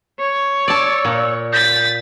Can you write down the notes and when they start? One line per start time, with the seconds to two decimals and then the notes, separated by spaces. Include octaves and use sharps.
0.19 C#5
0.68 D5 A5 E6
1.05 A#2
1.52 G6 A6 B6